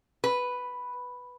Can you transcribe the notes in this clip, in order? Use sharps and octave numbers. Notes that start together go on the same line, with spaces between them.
B4